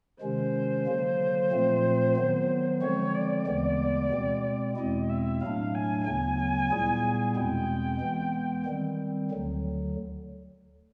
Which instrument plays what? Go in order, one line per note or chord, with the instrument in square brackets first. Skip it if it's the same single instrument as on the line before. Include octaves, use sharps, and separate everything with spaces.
[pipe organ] C3 D#3 G#3 C#4 [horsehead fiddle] C5
[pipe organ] D3 F#3 A#3
A#2 F3 A3 C4 F4
D#3 F#3 B3
[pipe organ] D3 F3 G#3 C4 [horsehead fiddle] C#5
[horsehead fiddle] D5
[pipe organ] D2 C#3 E3 G#3 B3
B2 G#3 C4
[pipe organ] E2 B2 G#3 C4 E4 [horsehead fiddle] D#5
[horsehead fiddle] E5
[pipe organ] A2 F#3 A3 D4 [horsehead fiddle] F5
[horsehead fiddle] G#5
[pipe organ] D2 C#3 F#3 B3 [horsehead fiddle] G#5
[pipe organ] A#2 G3 B3 E4 G#4
[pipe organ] E2 B2 G#3 C4 [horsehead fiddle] G5
[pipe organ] E3 G#3 B3
D#3 G3 C4
D2 D3 F#3